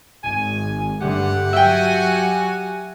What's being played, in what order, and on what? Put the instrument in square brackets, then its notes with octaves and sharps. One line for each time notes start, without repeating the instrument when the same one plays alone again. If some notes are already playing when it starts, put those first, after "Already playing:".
[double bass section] G#1 [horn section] G#5
[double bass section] G2 D3 A3 [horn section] G4 F#5
[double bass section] F#3 [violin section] F#4 G#5 [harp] E5 G5